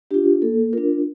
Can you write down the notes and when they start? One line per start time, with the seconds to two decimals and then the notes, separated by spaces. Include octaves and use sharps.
0.11 D4 F4 G4
0.42 A#3 A4
0.73 D4 F4 A#4